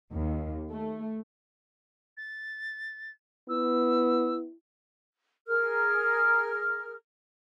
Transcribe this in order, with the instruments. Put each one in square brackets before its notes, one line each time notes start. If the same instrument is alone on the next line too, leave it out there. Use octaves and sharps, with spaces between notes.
[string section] D#2
A3
[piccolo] A6
[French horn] B3 [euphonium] E4 [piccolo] E6
[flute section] G#4 A#4 F6